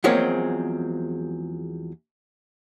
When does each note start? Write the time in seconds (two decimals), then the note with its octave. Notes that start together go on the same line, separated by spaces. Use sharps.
0.04 E2 F3 F#3 G#3 A#3 C4